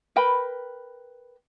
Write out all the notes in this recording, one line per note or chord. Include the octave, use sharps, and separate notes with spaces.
A#4 B4 G5 B5